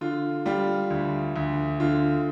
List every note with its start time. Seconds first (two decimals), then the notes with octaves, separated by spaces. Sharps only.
0.01 D3 F4
0.46 G3 F4
0.90 D2
1.36 D2
1.80 D3 F4